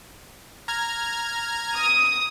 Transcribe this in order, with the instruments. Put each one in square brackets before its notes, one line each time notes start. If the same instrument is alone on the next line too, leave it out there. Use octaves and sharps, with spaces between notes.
[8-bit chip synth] A#5 F6 G#6
[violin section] D#6